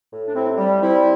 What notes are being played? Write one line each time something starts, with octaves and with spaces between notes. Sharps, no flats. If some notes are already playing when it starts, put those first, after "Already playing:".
A2
D4
C3 C4 E4
G3
G3 C4 E4